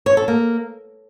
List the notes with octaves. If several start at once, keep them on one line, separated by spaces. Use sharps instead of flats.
C#5
A4
A#3